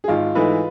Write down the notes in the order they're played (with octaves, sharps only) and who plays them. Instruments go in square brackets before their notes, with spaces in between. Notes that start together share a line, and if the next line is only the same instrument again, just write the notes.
[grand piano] G#4
[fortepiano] G#1 [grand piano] F4
[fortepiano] G#2 E3 A3 [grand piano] B4